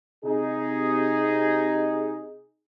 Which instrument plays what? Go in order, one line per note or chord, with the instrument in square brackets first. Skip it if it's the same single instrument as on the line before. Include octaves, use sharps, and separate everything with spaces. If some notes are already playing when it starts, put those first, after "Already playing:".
[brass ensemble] C3 D#4 G#4